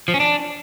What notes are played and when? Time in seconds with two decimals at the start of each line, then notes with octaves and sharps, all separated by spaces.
0.08 F3
0.14 C#4
0.20 D4